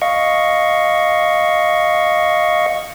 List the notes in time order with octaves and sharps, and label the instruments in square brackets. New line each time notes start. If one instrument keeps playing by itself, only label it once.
[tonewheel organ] D#5 F5 C#6